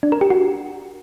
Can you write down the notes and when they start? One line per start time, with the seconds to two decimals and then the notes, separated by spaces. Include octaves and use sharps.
0.03 D4
0.12 A#4
0.21 G4
0.30 F#4